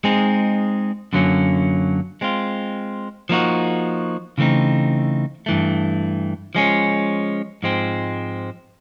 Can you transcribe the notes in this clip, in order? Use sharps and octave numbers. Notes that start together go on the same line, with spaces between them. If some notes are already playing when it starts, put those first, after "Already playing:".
G#3 C4 D#4 G#4
F#2 D3 F#3 A#3 C#4
G#3 C4 F4
F3 A#3 D#4 F#4
C#3 E3 A3 C4 D#4
G2 E3 A3
F3 G#3 C#4
G#2 F3 G#3 C4